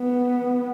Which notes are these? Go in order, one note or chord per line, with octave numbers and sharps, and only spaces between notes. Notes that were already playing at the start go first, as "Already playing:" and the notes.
Already playing: B3